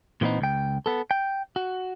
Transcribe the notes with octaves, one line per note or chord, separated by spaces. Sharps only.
A#2 E3 A3 B3 C4 D#4
C#2 G5
B3 A4
G5
F#4